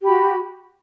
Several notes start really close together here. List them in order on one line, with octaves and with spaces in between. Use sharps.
G4 B5 F#4